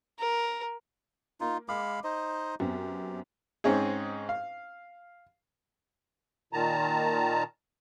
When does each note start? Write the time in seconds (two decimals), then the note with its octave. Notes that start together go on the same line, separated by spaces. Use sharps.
0.19 A#4
1.40 A#3 D#4 F4
1.69 G#3 F5 B5 D6
2.04 D#4 C5 D#5
2.60 F#2 B3 C4 G4
3.64 G#2 C4 C#4 D#4 G#4
4.29 F5
6.53 A#2 D#3 A5 A#5